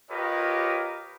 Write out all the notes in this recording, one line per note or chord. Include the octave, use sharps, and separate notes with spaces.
F4 G4 A#4 B4 C#5 D#5